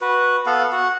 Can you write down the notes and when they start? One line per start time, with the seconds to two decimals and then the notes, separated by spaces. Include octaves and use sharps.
0.01 F#4 B4
0.46 B3 A4 F5 F#5
0.73 F#4 F#5